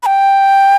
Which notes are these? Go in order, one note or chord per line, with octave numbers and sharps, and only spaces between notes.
B5
G5